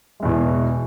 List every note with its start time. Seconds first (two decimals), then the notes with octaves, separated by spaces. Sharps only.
0.20 G#3
0.22 E2
0.25 B2
0.28 E3